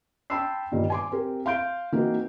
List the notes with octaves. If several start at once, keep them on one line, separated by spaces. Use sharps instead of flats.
G5 A5 B5 C6 E6 C7
G2 A#2 D#3 G3
G#5 C6 D6
C4 G4 A#4
F5 C6 G6 D7
E3 A#3 C4 D#4 F#4